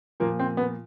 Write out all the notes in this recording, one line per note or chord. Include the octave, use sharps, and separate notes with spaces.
A#2 F3 A#3
C4
B3